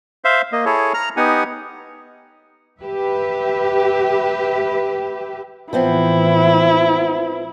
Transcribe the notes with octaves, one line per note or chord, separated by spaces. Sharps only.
C5 E5 F5
A#3 D#5
E4 G#4 A4 C#5
A#5 F6
B3 D#4 G4 F#5 G#5
G4 B4 E5
A2 E3 F3 B3 C4 E4